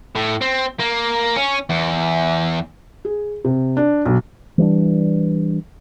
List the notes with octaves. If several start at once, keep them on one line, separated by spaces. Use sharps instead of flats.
A2
C4
A#3
C#4
E2
G#4
C3
D4
B1
E3 G3 B3 D4